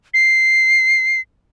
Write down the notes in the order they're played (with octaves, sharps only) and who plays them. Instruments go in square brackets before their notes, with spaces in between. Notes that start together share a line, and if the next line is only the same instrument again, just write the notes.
[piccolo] C7